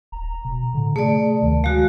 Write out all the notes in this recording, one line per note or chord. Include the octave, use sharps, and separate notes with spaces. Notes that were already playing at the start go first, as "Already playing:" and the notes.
D#1 A#5
B2
A2 D3
C3 A3 G#4 D5
D2 D#3
G#3 F#4 F5